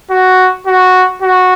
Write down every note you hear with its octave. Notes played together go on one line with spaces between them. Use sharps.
F#4
F#4
F#4